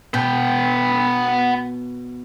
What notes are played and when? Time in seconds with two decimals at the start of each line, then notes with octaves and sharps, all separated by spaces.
0.14 B2 B3 G5